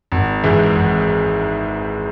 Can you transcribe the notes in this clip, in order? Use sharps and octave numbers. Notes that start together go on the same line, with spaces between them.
G#1
G#2 E3 G#3
G#1